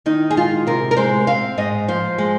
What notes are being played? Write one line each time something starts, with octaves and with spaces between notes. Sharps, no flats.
D#3 D#4
G#4
G#3 F4
C3 A#4
A#4
G#3 C5
C4 F5
G#2 D#5
F3 C5
G#3